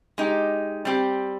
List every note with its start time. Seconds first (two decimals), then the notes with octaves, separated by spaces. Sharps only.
0.18 G#3 D#4 G4
0.85 G3 C4 G4